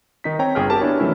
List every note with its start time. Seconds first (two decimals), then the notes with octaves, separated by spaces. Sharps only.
0.24 D#3 D#4 B6
0.39 C4 C#5 G5 A#5
0.55 G1 G#4 G5 F6
0.70 F#4 G4 A#4 A5
0.82 B3 D4 E4 C#5
1.00 D#3 E3 F#3 A3 C#4 E4